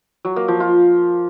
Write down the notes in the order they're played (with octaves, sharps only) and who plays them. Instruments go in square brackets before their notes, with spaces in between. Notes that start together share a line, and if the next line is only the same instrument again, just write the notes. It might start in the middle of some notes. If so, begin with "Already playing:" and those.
[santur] F#3
A#3
F3
F4